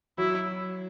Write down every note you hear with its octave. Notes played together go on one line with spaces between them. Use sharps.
F#3 E4